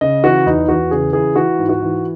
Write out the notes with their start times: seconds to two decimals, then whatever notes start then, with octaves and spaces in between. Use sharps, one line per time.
0.01 C#3 D#5
0.24 E3 F#4
0.46 E2 D#4
0.68 E2 F#4
0.91 C#3 G#4
1.13 E3 G#4
1.36 E3 F#4
1.58 G#2
1.69 F#4
1.81 E3